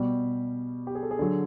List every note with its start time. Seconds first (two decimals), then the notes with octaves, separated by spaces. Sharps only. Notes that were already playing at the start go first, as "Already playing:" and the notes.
Already playing: B2 G3 G4
0.87 G4
0.95 G#4
1.03 A4
1.11 G#4
1.19 D3 F#3